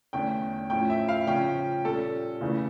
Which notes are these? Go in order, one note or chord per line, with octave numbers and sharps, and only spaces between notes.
E2 D3 A3 C#4 G5
A2 F3 A3 C#4 G5
E5
F5
C#3 F3 C#4 G5
A#2 G3 C#4 A4
E2 C#3 E3 A3